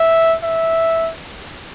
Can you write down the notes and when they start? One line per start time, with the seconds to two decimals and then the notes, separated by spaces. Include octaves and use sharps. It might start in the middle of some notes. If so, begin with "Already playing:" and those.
Already playing: E5
0.43 E5